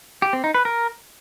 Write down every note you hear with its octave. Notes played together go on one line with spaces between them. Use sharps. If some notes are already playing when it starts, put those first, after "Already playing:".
G4
C4
D#4
B4
A#4